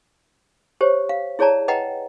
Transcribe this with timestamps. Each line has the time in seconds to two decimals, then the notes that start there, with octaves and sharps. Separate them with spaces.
0.81 G4 C5 C#5
1.09 F5
1.39 E4 G#4 C#5 D5 A5 A#5
1.68 B4 D#5 F#5 G5 A#5